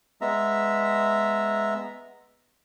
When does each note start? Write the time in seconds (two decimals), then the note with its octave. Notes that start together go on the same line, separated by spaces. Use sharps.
0.21 G#3 B3 E5 A#5